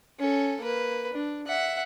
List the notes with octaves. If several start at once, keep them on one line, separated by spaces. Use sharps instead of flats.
C#4 A4
A#3 B4
D4
E5 F#5